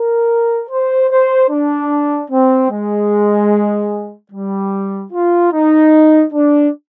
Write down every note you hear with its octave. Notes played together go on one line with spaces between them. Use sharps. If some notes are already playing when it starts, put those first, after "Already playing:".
Already playing: A#4
C5
C5
D4
C4
G#3
G3
F4
D#4
D4